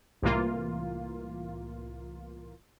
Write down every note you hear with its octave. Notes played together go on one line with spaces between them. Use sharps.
C2 A2 E3 A#3 F4